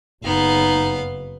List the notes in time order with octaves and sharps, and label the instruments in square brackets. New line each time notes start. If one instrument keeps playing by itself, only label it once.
[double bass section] F#1 C#3 [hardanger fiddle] B3 F5 [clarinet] D#4